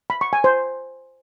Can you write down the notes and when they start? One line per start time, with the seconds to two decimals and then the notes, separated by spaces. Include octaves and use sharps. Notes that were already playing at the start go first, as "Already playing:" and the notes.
0.10 B5
0.21 C#6
0.33 G#5
0.44 C5